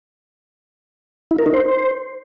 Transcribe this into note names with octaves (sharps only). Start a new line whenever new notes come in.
E4
A#4
D#4
C5